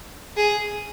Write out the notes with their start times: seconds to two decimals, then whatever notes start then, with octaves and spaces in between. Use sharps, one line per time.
0.37 G#4